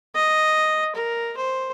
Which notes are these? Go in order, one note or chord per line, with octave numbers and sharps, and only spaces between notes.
D#5
A#4
C5